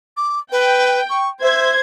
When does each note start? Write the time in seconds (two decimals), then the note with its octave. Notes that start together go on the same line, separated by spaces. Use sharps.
0.17 D6
0.52 B4 G5
1.10 C#6
1.42 C5 E5 G#6